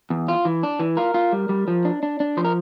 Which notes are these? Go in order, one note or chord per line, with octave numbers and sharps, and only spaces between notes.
E2
F4
E3
D4
E3
F4 A#4
F4
G3
G3
F3
D4
D4
D4
F3 C5
A#4